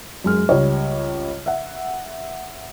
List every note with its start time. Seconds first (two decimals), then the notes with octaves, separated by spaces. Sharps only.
0.24 F#2 G#3 F6
0.49 C#2 G3 C#5
1.46 E5 F#5